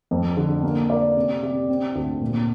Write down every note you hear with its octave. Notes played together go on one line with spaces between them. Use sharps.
F2
D3
A#3
D5
C3
C3
C4
D2
A#2